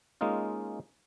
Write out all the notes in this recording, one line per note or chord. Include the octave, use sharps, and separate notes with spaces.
G#3 A#3 C#4 D#4 F4